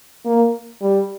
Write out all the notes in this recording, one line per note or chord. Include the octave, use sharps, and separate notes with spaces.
A#3
G3